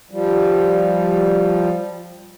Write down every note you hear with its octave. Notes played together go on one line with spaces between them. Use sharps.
F3 G3